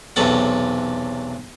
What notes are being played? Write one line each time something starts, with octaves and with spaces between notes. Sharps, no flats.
B1 E2 C3 F#3 A4 F#5